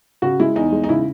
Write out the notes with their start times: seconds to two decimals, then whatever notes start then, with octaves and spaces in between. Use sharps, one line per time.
0.22 C#3 F#4
0.39 G#3 E4
0.56 E2 D#4
0.72 G#3
0.84 D#4
0.89 C#3 E4